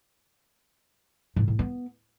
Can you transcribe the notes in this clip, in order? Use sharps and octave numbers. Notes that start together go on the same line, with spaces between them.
A2
A2
B3